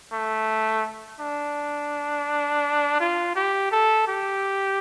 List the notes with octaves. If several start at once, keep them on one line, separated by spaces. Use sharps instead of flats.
A3
D4
F4
G4
A4
G4